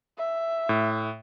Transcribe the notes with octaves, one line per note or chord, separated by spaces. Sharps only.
E5
A2